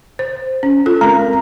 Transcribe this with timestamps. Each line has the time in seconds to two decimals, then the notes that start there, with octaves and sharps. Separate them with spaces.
0.19 C5
0.63 C#4
0.86 F4 A4
1.01 G#3 C4 A#4 A#5